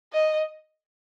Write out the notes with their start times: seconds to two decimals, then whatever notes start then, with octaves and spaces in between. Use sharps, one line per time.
0.13 D#5